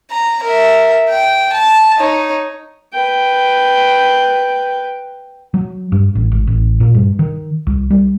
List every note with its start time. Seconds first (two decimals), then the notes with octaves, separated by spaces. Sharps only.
0.11 A#5
0.43 A#4 E5
1.10 G5
1.52 A5
1.97 D#4 C#5
2.93 B4 G5
5.54 F#3
5.92 G2
6.15 A1
6.32 G#1
6.47 A1
6.80 A#2
6.94 G2
7.19 D#3
7.67 C2
7.90 G3